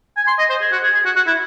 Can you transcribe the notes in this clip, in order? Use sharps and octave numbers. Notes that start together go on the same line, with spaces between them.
G#5
C6
D#5
C5
G#4
F#4
G#4
G#4
F#4
F#4
E4